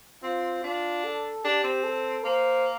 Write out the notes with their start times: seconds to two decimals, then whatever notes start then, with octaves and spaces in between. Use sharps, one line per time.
0.23 C4 F4
0.63 D4 F4
1.04 A4
1.45 D4 G4
1.64 C4
1.84 A4
2.24 A#3 C5